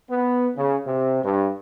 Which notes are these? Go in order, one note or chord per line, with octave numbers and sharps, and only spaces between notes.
B3
C#3
C3
G2